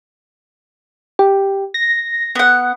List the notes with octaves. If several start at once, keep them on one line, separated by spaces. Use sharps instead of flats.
G4
A#6
B3 F#5